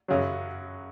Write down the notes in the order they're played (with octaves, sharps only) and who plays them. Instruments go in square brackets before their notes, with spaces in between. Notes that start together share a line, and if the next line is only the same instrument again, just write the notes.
[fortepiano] F#2 C#3 F#3